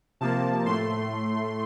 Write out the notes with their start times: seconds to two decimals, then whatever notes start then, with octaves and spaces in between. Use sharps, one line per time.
0.21 C3 F3 A#3 A5
0.65 A2 A3 C6